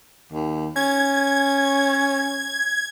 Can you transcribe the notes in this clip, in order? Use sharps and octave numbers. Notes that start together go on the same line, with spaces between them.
D#2
C#4 G#6